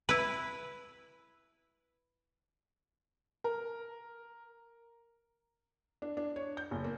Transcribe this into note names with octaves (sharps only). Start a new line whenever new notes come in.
E4 B4
A#4
D4
D4
C#5
G6
F#1
A#3